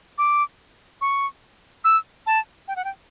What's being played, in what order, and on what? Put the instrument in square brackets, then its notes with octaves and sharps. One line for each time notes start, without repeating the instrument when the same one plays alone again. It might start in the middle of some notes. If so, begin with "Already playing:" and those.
[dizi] D6
C#6
E6
A5
G5
F#5
G5